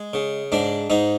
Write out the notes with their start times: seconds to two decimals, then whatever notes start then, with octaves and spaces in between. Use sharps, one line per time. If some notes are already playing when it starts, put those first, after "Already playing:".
Already playing: G#3
0.13 C#3
0.52 G#2 D4
0.90 G#2 D#4